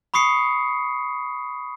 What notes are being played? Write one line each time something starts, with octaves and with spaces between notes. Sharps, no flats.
B5 C#6 D#6 C7 C#7